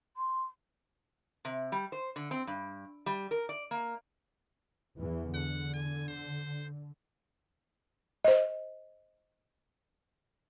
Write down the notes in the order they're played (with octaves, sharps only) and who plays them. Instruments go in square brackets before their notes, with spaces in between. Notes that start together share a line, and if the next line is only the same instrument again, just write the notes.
[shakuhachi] C6
[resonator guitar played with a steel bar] C3
G3
C5
D3
C4
G2
G3
A#4
D5
A#3
[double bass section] E2 E3
[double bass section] D3 [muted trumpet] F#5
[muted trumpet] G#5
C5
[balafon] C5 D#5